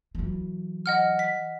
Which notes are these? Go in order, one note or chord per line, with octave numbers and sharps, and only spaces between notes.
E3 F#3
D#5 F#5 F6
B6